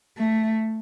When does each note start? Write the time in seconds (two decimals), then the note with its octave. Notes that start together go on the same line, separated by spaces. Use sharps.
0.18 A3